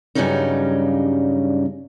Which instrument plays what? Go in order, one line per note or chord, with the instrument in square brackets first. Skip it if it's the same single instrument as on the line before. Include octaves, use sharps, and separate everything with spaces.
[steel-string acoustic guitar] G2 C#3 F#3 G3 C#4 D#4